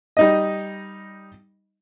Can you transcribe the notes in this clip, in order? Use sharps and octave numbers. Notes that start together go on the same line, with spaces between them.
G3 D#4 D#5